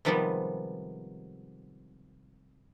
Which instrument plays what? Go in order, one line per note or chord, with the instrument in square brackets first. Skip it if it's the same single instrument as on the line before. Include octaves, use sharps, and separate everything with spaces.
[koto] C3 D#3 F3 G3 G#3 B3